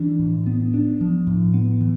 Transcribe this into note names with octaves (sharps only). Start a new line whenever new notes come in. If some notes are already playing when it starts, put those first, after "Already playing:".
Already playing: E3 D4
A2
B3
D4
F3
A2
B3
E3